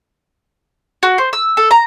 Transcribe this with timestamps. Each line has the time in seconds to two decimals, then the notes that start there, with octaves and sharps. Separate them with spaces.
1.03 F#4
1.18 C5
1.33 E6
1.57 A4
1.71 A#5